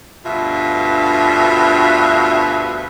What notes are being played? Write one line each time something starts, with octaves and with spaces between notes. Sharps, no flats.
D2 G2 B2 F4 E5